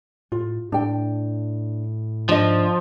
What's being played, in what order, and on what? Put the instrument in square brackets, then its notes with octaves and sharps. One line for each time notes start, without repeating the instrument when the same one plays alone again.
[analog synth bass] A2 [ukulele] F4
[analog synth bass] A2 [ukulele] D4 G5
[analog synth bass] G#2 [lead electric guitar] F3 [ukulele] D4 D#5